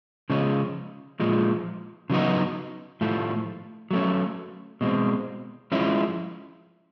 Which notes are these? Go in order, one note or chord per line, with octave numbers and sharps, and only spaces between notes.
C#3 F3 G#3 C#4
A#2 F3 G#3
C#3 F#3 B3 D#4
A2 F3 A3
F#3 A3 C#4
B2 G#3 C4
F3 G#3 C#4 E4